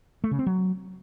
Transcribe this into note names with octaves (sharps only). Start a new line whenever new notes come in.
A3
C#3
C4
F#3